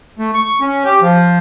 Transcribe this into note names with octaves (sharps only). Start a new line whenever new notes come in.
A3
C#6
C#4
G4
F3